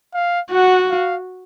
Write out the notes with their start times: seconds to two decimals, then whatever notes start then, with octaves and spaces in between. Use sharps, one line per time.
0.14 F5
0.51 F#4 F#5
0.90 F5